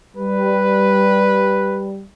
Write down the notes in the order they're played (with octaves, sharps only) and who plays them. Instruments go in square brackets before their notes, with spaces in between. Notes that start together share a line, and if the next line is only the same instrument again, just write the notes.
[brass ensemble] G3 [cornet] B4